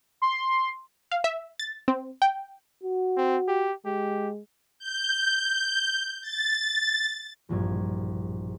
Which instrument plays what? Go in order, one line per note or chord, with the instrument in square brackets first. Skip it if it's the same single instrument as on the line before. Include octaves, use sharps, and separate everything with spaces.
[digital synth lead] C6
[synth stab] F5
E5
A6
C4
G5
[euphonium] F#4
[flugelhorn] C4
G4
[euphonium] G#3 [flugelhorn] G4
[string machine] G6
A6
[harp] E1 A#1 G2 G#6